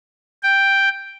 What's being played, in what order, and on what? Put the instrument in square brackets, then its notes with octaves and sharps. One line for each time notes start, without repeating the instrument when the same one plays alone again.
[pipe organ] G5